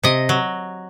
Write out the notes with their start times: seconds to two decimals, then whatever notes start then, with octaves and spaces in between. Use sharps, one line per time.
0.03 C3 D#5
0.29 F#3